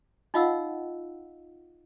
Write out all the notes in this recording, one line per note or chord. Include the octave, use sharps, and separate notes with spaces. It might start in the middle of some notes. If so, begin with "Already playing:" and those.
D#4 F4 D#5 F5 F#5 E6